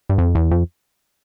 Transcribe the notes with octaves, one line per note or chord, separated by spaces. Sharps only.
G2
F2
E2
F2